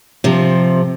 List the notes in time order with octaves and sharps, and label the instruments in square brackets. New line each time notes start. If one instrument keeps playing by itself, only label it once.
[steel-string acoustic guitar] C3 F3